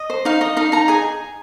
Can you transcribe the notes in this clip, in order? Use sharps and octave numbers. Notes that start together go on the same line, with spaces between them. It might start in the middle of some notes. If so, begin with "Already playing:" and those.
Already playing: D#5
C5
D#4 F5
D#4 D#5
D#4 F5
D#4 A#5
G#4 G#5